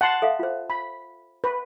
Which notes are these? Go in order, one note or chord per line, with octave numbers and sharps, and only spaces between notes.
F#5 A5 C6
A4 E5 F5
F4 C5
B5
B4